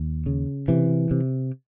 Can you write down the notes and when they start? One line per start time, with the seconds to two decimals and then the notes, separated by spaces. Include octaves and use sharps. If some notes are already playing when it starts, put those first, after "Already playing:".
Already playing: D#2
0.26 C#3
0.68 C3 E3
1.11 C3